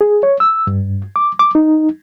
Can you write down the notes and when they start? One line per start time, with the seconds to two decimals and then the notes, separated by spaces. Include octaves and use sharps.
0.01 G#4
0.23 C#5
0.40 E6
0.67 G2
1.16 D6
1.39 D6
1.55 D#4